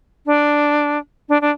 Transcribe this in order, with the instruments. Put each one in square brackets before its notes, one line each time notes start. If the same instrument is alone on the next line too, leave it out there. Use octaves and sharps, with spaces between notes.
[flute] D4
D4
D4